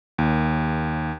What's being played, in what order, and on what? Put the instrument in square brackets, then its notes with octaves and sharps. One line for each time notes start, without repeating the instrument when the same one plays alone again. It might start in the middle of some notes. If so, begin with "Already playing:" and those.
[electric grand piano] D#2